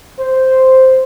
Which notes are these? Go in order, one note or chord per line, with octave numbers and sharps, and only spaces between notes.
C5